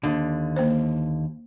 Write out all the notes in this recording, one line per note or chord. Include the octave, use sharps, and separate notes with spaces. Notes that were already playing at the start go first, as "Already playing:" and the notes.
D#2 D3
A#3 C5